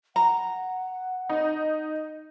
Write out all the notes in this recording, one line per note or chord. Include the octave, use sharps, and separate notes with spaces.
F#5 A#5
D#4